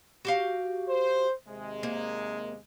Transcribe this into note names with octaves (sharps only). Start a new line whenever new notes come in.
F#4 G4 F5
C5
D#2 C3 G#3
A#3